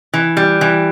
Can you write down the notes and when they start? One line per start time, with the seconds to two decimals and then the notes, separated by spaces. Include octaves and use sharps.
0.14 E3
0.37 G3
0.61 E3